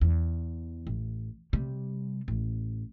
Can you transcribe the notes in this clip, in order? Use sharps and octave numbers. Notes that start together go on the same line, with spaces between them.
E2
A1
C3 G3
A1